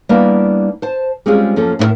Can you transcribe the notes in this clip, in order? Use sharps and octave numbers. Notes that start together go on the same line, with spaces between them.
G3 A#3 B3 D4 E4 A#4
C5 A5
G3 G#3 C4 C#4 F4 G#4
F#2 F3 A#3 C#4 A4
A2 E4 F4 A#4 E5